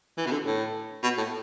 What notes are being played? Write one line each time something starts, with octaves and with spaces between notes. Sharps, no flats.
E3
B2
D3
A2
B2
A2